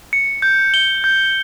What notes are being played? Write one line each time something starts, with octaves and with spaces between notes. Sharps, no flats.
C#7
G6
G7
G6